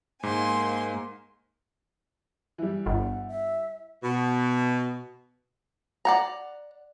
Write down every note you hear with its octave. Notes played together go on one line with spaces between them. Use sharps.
G#2 A#3 G#5 C6
E3 G3
G1 F#5
E5
B2
D5 F#5 A#5